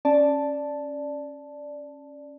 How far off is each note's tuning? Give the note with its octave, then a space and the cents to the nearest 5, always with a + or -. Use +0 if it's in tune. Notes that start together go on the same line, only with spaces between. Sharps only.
C#4 -10 D5 +0 A5 -5